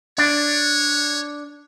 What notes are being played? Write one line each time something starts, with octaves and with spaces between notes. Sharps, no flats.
D4 C#5